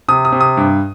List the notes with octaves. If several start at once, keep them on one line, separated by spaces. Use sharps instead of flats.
C3 D#6
D#6
C3
D#6
G2